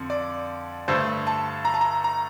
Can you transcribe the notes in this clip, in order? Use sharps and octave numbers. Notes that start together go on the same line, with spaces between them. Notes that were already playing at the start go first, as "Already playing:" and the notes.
Already playing: F2 D3
D5
G2 D3 A3 C5
A5
A#5
A5
A#5
A#5